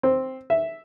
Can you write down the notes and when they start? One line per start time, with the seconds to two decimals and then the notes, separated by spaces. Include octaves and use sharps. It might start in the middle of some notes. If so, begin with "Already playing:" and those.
0.03 C4
0.50 E5